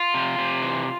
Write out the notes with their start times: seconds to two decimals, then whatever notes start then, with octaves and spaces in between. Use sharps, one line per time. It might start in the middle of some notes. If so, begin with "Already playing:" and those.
Already playing: F4
0.14 C3
0.38 C3
0.62 E3